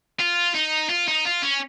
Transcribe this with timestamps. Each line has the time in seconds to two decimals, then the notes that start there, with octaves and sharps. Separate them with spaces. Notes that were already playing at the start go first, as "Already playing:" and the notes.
0.20 F4
0.54 D#4
0.89 F4
1.08 D#4
1.26 F4
1.42 C#4